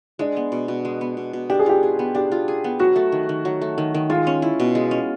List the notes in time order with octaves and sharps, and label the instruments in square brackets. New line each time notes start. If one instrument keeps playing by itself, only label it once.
[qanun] G#3 [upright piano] D4
[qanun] B3
B2
B2
G#3
B3
B2
B2
[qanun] D4 [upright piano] G4
[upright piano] G#4
[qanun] F4 [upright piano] G4
[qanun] G#4
B3
[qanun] D4 [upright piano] G4
[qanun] F4
G#4
B3
[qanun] F#3 [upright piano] F#4
[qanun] A3
D#3
D#3
F#3
A3
D#3
D#3
[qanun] G#3 [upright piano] F4
[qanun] C#4
E4
B2
G#3
C#4